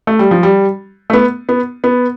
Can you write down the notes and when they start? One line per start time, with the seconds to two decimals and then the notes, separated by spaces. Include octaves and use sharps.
0.07 A3
0.19 G3
0.31 F3
0.43 G3
1.10 A3
1.13 B3
1.49 B3
1.84 B3